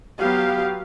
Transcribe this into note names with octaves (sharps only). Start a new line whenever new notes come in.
F#3 B3 G4 F5